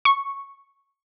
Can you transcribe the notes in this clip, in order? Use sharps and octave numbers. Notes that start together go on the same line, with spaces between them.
C#6